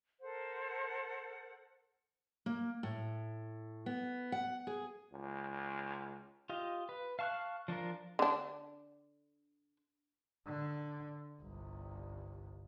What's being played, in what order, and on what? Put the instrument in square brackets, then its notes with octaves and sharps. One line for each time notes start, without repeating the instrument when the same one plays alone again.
[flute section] A4 A#4 C5 F#5
[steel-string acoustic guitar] A#3
A2
B3
F#5
G#4
[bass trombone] C#2
[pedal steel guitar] F4 G4 D#5
B4
F5 A5 C#6 F6 F#6
F3 D4 F4 A#4
[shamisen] D3 D4
[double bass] D3
G1 C2